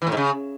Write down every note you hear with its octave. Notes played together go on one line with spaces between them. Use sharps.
E3
A2
G#2
C#3